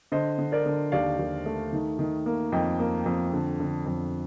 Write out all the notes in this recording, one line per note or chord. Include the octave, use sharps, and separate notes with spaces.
D3 C5 D#5
D3
A#4 D5
D3
D#2 D5 F5
D#2
A3
D#3
D#3
A#3
F2 D#5 G5
A#3
F2
D3
D3
F2